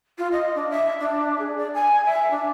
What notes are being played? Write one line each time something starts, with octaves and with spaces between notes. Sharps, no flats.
F4
D#5
D4
E5
D4
G#4
D5
G#5
E5
D4